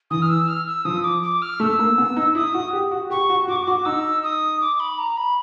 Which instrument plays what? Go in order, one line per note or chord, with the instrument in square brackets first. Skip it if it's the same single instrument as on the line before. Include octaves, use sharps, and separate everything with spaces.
[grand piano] E3 [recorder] D#6
[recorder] F6
E6
F6
E6
[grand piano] F3 [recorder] D#6
[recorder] D6
D6
F6
[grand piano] A3 [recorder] E6
[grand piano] A#3
B3
D#4
[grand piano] E4 [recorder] D#6
[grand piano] F#4
G4
F#4
[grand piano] G4 [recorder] C#6
[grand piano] F#4
[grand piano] F#4 [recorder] D6
[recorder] C#6
[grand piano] F#4 [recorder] D6
[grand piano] D#4 [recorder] E6
[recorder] D#6
D6
B5
A#5
B5